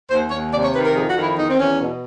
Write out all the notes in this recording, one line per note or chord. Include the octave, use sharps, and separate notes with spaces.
D#2 C5
D#2 C#5
C3 D5
C#5
D#3 B4
A#4
F2 G#4
F#4
D#3
E4
E2 D#4
C4
E2 C#4
B2